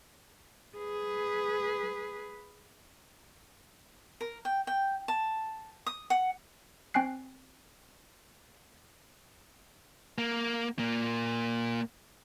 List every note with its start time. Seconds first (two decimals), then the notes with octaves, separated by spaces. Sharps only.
0.78 G#4 B4
4.21 A#4
4.45 G5
4.67 G5
5.08 A5
5.86 D#6
6.10 F#5
6.94 C4 G5 G#5 F#6 C7
10.18 A#3
10.78 A#2 A#3